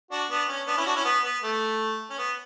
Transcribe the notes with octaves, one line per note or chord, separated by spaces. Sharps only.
D4 F#4
B3 D4
C#4
B3 D4
C#4 E4
D4 F#4
C#4 E4
B3
B3
A3
C#4
B3